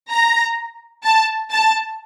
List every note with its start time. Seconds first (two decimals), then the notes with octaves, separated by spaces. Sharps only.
0.11 A#5
1.05 A5
1.52 A5